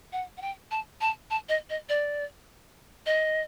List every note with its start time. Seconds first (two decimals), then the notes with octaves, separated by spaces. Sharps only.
0.12 F#5
0.37 F#5
0.41 G5
0.71 A5
1.01 A5
1.30 A5
1.49 D#5
1.70 D#5
1.89 D5
3.06 D#5